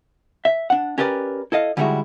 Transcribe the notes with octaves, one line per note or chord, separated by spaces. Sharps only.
E5
D4 F#5
C#4 G4 A#4 B4 D5
E4 A4 D#5 F5
D3 G3 G#3 D#4 E4 F#4